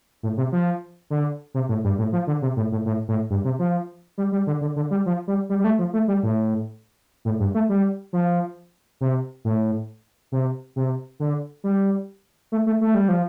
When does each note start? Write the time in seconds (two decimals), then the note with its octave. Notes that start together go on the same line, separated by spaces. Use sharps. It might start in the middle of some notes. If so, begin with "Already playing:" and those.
0.23 A2
0.37 C3
0.52 F3
1.10 D3
1.54 C3
1.69 A2
1.84 G2
1.98 A2
2.12 F3
2.27 D3
2.42 C3
2.56 A2
2.72 A2
2.86 A2
3.08 A2
3.30 G2
3.44 C3
3.59 F3
4.18 G3
4.32 G3
4.47 D3
4.61 D3
4.76 D3
4.91 G3
5.06 F3
5.27 G3
5.49 G3
5.60 G3
5.64 A3
5.79 F3
5.93 A3
6.08 G3
6.23 A2
7.25 A2
7.39 G2
7.54 A3
7.69 G3
8.13 F3
9.01 C3
9.45 A2
10.32 C3
10.76 C3
11.20 D3
11.64 G3
12.52 A3
12.66 A3
12.81 A3
12.95 G3
13.09 F3